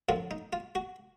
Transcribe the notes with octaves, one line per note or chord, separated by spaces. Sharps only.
F#2 D3 F3 F4
D#4
F4
F#4